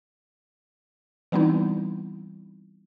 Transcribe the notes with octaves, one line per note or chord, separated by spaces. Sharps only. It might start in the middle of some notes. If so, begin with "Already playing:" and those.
E3 G3 B3 C4 D#4 E4